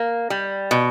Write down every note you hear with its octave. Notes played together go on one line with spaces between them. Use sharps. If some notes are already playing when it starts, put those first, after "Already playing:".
Already playing: A#3
G3
B2